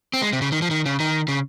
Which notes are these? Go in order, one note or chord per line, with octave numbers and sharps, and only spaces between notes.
C4
G#3
C3
C#3
D#3
F3
D#3
C#3
D#3
C#3